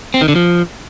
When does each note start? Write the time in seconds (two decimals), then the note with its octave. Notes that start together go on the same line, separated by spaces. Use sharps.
0.14 C4
0.21 D#3
0.28 D3
0.36 F3